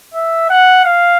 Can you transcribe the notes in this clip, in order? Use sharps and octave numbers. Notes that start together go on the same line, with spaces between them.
E5
F#5
F5